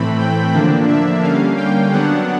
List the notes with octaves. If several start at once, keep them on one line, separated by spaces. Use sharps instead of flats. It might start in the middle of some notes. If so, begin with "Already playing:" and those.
Already playing: A2 E3 A3 C4 B5
G5
D3 F3 A#3 D4
E5
D3 G3 A#3 C#4 F5
G5
D3 F#3 B3 D4 F#5